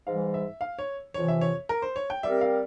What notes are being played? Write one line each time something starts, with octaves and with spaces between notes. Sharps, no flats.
G#2 E3 G3 F5
E5
F5
C#5
F2 C3 E3 C#5
E5
C#5
A#4
C5
C#5
G5
G3 C4 G4 A#4 E5
F5